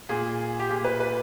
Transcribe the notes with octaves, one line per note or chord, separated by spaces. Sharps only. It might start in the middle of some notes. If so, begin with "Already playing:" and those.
A#2 G#4
G4
A#2 G#4
B4
B4